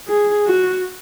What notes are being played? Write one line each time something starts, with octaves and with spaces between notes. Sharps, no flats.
G#4
F#4